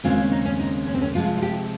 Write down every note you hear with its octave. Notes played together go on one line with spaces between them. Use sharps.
D#2 C#3 G#3 C4 F4
C#4
D#4
C#4
D#4
C#4
C4
C#4
C3 F3 G#3 F4
F4
G4